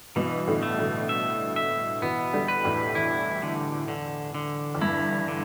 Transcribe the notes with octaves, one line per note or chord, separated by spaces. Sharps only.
G2 B2 E3
A2 D3
A3
A2 D3
E5
E5
B2 E3 B3
D3 G3
B4
E2 A2
E2 E4
D3
D3
D3
E2
G2 E4
D3